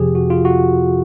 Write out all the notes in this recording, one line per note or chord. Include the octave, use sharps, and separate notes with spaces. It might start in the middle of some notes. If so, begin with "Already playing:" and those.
Already playing: F2 C3 F3 G4 G#4
F#4
F4
F#4